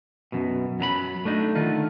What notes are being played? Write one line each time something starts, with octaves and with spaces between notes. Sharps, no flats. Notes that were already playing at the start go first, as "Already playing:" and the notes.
F#2 B2
F#2 F#3 A#5 B5
A3 D4 D#4
D3 D#3 A3 F4